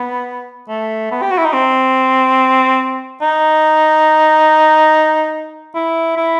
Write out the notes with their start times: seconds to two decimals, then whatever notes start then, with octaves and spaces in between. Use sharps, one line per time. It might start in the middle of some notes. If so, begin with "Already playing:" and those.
Already playing: B3
0.69 A3
1.11 B3
1.22 G4
1.31 F#4
1.38 E4
1.45 D#4
1.53 C4
3.22 D#4
5.75 E4
6.17 E4